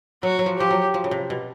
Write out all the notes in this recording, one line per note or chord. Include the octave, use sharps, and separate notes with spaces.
F#3 F#4
F#3
F3
F3 G4
F#3
F3
C#3
C3
B2